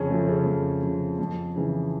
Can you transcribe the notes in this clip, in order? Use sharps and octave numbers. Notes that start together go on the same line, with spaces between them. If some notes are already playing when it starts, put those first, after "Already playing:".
Already playing: F2 C#3 C#4
C#3 F3 A3
C#3 C#4
F2
C#3 F3
F2
C#3 E3